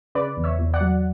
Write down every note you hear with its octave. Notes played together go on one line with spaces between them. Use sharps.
C#3 B4 D5
E2
C#5 E5
E2
D5 F#5
F#3